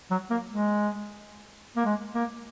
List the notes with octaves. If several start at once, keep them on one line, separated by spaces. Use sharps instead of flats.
F#3
A#3
G#3
A#3
G#3
A#3